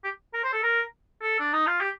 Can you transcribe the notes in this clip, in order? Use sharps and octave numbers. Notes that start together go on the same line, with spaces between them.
G4
A#4
C5
A4
A#4
A4
D4
D#4
F4
G4